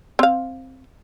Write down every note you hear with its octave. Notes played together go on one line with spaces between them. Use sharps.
C4 F5